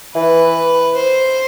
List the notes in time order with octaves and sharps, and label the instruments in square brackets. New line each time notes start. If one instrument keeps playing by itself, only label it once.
[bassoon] E3 [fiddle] B4
[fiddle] C5